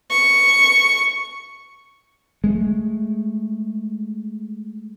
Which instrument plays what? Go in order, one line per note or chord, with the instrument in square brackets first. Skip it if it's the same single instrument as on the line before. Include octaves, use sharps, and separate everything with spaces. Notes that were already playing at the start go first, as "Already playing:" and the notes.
[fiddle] C#6
[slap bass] G#3 A3